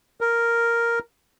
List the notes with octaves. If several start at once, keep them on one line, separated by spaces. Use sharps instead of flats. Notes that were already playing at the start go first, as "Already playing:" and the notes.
A#4